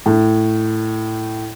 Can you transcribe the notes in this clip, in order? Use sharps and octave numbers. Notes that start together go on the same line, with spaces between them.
A2